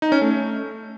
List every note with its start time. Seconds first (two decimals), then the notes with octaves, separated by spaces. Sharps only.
0.02 D#4
0.12 C#4
0.22 A3